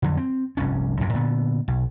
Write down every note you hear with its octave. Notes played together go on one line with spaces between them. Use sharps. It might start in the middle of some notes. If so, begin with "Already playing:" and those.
F2 D3 F#3
C4
F1 C2 G2 C#4
A#1 F#2 A2 C3
A#2 D3 B3
B1